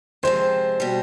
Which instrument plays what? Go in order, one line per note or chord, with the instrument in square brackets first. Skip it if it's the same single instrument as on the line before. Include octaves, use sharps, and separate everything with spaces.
[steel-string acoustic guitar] C3 F3 G#3 C4 [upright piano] C5
[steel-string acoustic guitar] B2 G3